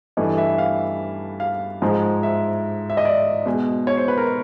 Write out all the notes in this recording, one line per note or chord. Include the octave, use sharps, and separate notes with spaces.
G2 E3 A3 D#5
E5
F5
F5
G#2 F3 G#3
E5
E5
D#5
D5
B2 G#3
C#5
C5
B4
A#4